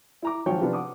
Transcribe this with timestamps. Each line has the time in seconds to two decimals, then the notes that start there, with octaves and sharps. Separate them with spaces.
0.22 E4 A#5 D6
0.46 G#1 F3 F#3 C#5 G5 C#6
0.61 C3 F3 B3 D4
0.73 F#5 D6 D#6